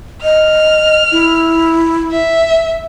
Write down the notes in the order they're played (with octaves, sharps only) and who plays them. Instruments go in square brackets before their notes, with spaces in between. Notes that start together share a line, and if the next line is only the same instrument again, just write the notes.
[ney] D#5 [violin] F6
[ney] E4
[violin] E5